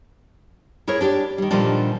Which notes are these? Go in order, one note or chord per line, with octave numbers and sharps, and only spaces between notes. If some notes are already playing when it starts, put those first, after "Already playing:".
E4 G#4 A#4 C#5
D4 G4 C#5 D5
D#3 G3
A#2 D3 D#3 F3 G3 D4